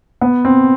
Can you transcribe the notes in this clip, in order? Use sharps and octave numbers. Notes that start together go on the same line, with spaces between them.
B3
C4